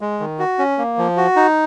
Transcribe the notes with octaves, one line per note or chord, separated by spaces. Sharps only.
G#3
D#3
F#4
C#4
A#3
F3
F#4
D#4